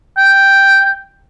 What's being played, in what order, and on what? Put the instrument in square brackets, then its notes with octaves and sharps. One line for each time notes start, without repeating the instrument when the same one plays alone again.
[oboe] G5